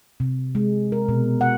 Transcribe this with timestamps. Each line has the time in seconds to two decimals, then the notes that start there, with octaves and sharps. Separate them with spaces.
0.20 C3
0.55 G#3
0.92 A#4
1.08 B2
1.41 F#5